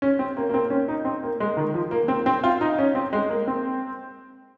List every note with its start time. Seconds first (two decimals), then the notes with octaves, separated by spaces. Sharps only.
0.02 C#4
0.19 C4
0.37 A#3
0.50 A#3
0.54 C4
0.70 C#4
0.88 D#4
1.05 C4
1.23 A#3
1.40 G#3
1.57 D#3
1.74 F3
1.91 A#3
2.08 C4
2.26 C4
2.44 F4
2.61 D#4
2.78 C#4
2.95 C4
3.13 G#3
3.29 A#3
3.47 C4